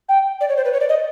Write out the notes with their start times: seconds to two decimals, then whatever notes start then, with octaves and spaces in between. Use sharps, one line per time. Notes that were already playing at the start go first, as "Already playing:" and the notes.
0.09 G5
0.41 D5
0.49 C#5
0.57 C5
0.65 B4
0.73 C#5
0.81 D5
0.89 D#5